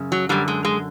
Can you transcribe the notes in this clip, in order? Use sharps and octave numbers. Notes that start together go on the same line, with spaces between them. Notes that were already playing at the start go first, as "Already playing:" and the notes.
Already playing: F#2 C#3
F#3
F#2 D3 G3
G#3
G#3